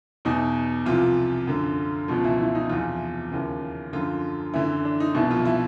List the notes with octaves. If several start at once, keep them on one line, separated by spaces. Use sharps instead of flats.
E2 B2 D#4
C2 C3 E3 F3 F4
F#2 D3
C#2 B2 F3 F4
E3 E4
E3 E4
D#4
E2 C3 E3 F3 F4
D#2 C#3 E3
F#2 D3 F3 F4
F#2 D3 E3 E4
D4
D#4
C2 B2 E3 E4
F3 F4
E3 E4